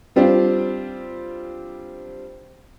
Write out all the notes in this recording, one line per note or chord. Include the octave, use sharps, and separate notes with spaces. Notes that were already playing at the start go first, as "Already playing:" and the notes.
G3 C4 D4 F4